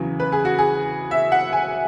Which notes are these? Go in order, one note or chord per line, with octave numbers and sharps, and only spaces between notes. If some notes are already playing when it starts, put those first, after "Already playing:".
Already playing: E2 C#3 F#3
B4
G#4
F#4
G#4
E5
F#5
G#5